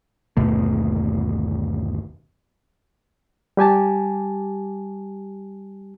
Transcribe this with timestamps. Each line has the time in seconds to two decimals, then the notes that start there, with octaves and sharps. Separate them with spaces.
0.37 G1 D#2 B2 A3
3.57 G3 G4 G#5 A5